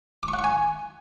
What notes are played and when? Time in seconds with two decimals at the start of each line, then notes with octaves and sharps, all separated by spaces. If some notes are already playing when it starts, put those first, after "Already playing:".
0.23 D6
0.28 C#6
0.33 F#5
0.39 C#6
0.44 G#5